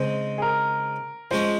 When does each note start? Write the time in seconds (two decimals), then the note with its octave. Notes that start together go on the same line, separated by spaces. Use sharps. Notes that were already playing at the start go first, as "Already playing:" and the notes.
Already playing: C#3 G#3 C4 D#4 C5
0.38 G#4
0.42 A#4
1.31 F3 G#3 C#4 C5